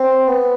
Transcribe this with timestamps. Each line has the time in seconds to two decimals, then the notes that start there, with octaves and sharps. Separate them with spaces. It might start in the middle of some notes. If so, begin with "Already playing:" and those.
Already playing: C4
0.28 B3